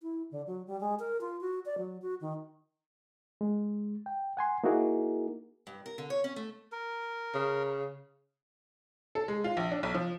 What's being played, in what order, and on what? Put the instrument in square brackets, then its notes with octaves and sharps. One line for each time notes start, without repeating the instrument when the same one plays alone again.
[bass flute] E4
D3
F#3
G3
G#3
A#4
F4
F#4
D5
F#3
F#4
D#3
[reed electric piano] G#3
G5
F#5 G#5 C6
A#3 D#4 E4 F#4 G#4 A#4
[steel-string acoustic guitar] G2
A#4
D3
C#5
C#4
A3
[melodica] A#4
[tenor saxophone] C#3
[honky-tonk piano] A4
G#3
F4
A#1
D4
B1
F3